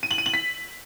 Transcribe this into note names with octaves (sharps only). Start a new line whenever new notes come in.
D#7
F#7
D#7
F#7
B6